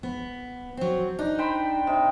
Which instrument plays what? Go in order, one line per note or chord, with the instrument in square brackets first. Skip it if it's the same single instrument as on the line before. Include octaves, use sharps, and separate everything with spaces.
[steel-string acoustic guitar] B3
F#3 C4
[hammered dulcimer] D4 [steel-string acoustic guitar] D#4
[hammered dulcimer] C5 G5 B5
C3 D#4